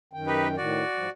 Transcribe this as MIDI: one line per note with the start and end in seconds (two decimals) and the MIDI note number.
0.13 0.56 42
0.13 0.56 51
0.13 0.56 79
0.27 0.47 63
0.27 0.47 67
0.27 0.47 71
0.57 0.83 45
0.57 0.83 51
0.57 1.10 66
0.57 1.10 74
0.96 1.07 44
0.96 1.07 53
0.96 1.07 55